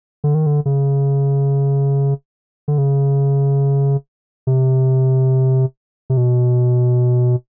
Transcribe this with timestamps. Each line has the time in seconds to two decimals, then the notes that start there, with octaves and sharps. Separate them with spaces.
0.24 D3
0.35 D#3
0.46 D3
0.66 C#3
2.68 D3
2.78 C#3
4.47 C3
6.10 C3
6.17 B2